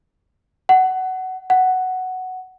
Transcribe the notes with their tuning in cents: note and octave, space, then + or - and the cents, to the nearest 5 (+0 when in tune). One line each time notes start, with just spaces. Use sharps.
F#5 +15
F#5 +5